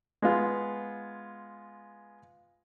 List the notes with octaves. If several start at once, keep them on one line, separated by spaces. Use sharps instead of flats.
G#3 B3 F4